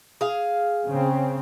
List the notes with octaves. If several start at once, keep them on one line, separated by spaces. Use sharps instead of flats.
G#4 F5
C#3 C4